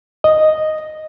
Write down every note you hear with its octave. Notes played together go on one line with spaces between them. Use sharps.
D#5